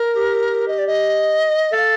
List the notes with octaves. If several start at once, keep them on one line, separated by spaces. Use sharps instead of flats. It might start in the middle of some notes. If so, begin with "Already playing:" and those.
Already playing: A#4
G4
D#5
D5
D#5
A4 F5